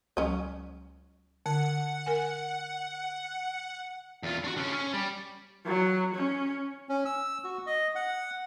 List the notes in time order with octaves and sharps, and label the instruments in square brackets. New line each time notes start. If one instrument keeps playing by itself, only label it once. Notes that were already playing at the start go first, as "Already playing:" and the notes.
[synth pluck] C#2 F#3 [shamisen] C#4 D#5
[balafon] D3 [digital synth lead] F#5
[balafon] A#4 G#5
[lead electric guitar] E2 F4
D4 F#4
D3 C#4
C#4
G3
[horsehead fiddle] F#3
C#4
[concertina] C#4
E6
F#4
D#5
F#5